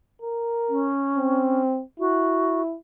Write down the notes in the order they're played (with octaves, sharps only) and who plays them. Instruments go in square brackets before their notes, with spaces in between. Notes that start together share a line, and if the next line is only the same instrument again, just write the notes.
[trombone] A#4
[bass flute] C#4
[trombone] C4
[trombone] E4 [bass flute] F#4